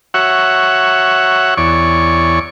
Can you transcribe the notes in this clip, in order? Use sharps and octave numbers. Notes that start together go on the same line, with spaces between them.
F#4 C#5 E5 F#5
E2 C#5 D5 C#6